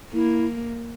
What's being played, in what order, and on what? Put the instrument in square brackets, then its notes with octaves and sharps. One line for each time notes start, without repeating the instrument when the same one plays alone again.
[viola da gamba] A#3 [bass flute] E4